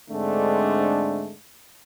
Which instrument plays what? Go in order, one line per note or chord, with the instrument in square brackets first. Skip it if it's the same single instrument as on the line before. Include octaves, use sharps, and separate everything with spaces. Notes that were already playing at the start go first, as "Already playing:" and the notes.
[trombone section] G#2 D3 G#3 A3 C4 D4